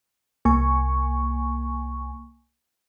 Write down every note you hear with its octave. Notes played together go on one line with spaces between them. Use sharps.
C2 A#3 G#5 C#6